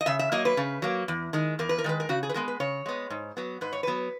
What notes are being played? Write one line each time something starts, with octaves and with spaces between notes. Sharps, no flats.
D#5
C#3 E5
E5
F#3 A#3 D#5
B4
C#3
F#3 A#3
E2
D#3 G#3
E2 A#4
B4
A#4
D#3 G#3 B4
A#4
C#3 F#4
G#4
B4
G#3 B3 A#4
B4
C#3 C#5
G#3 B3
G#2
F#3 B3
G#2 B4
C#5
F#3 B3 B4